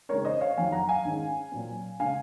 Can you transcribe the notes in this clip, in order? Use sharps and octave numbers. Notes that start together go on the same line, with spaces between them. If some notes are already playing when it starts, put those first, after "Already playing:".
C#3 G#3 C4 D#4 A#4 C#5
C5 D#5
C#5 F5
F2 D#3 F#3 F5 G#5
F#5 A#5
F5 G#5
G#2 D#3 G#3 C#4
A#2 F#3 C4
C#3 G#3 C#4 F5 G#5